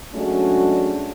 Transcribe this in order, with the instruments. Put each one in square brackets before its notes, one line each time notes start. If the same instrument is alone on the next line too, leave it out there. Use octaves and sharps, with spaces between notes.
[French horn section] F#3 G#3 A3 C#4 D4 F#4